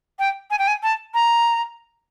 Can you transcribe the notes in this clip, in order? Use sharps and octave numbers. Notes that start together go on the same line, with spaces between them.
G5
G#5
G5
G#5
A5
A#5